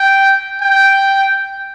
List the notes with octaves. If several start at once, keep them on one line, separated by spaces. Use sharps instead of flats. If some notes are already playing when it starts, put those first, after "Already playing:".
Already playing: G5
G5